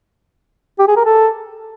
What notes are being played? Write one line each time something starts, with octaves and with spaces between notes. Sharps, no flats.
G4
G#4
A#4
A4